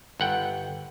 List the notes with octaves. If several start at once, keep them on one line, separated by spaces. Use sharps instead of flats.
G1 F#5 G5